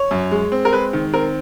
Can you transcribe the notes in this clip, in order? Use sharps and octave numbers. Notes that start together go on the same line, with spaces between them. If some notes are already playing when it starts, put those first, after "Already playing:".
Already playing: C#5
F#2
G#3
C4
A#4
G#3 B4
D#3
C4 A#4